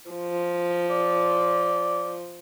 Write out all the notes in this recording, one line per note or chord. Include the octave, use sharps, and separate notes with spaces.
F3
D5